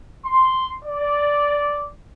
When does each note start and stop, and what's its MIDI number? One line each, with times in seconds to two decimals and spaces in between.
0.24 0.74 84
0.84 1.88 74